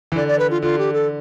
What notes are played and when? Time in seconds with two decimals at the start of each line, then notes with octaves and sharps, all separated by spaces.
0.12 E3
0.16 D3 D5
0.28 D5
0.39 B4
0.51 F4
0.62 D3 F4
0.78 G4
0.93 A4